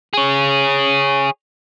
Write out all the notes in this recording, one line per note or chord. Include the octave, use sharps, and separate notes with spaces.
G#4 C#5